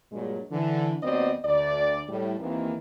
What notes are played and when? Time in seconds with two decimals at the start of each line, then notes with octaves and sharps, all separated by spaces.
0.12 G2 A#2 F#3 G#3
0.51 D3 E3
1.03 D#2 F#3 B3 C4 D5 D#5
1.45 D2 D5
2.09 A2 G3
2.39 D#2 D#3 E3 A#3 C4 D#4